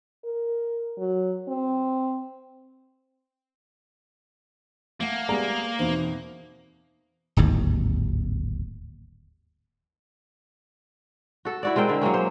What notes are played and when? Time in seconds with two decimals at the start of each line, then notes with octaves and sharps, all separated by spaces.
0.25 A#4
0.98 F#3
1.48 C4
5.00 A3 A#3 F#5
5.29 G3 G#3 B3 G#4 D5 A#5
5.79 E2 B2 D#3 C4
7.37 D1 G#1 D#2
11.45 F#4 A4
11.63 E4 F#4 D5
11.76 G#3 C4 A#4 G5
11.88 D3 E4
12.01 F#3 G#3 A#3 C#4
12.14 C5